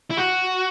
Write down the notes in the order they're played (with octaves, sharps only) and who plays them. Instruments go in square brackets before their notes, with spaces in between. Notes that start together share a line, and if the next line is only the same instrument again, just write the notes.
[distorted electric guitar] E4
F#4